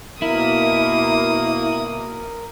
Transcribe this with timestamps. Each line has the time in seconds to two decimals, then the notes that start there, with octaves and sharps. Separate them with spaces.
0.22 B2 A#3 E4 A#4 D#6